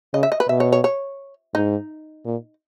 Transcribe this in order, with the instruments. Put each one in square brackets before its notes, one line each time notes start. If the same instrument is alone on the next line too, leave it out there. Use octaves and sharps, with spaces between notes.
[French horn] C#3 [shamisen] D#5
[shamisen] E5
D#5
B4
[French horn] B2 [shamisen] E5
[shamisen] C#5
C#5
C#5
[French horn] G#2 [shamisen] D#4
[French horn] A#2